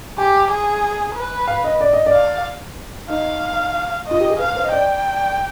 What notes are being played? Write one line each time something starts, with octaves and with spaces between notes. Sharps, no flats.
G4 G#5
G#4
B4
F5
D#5
D5
D#5
D5
F5
D#4 F5
F4 D#5
G4
G#4
B4 F5
C5
D#5
D5 G5